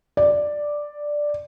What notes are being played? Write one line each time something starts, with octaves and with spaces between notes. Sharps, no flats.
D5